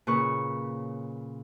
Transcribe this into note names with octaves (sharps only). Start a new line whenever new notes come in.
A#2 C#3 B4 C#6